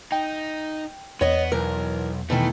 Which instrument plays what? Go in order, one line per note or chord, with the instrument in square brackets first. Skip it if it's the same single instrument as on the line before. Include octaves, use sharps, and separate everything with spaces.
[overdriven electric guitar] D#4 [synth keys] G5
[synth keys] E2 [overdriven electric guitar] B3 [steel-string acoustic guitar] C#5 D#5
[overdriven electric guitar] B1 [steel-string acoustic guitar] E3 A#4
[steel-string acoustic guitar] B2 D#3 E3 [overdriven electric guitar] A3